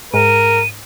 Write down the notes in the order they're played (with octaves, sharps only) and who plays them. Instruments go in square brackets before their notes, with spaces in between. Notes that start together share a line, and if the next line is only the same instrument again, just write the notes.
[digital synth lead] G#2 [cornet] A#4 [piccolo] D#7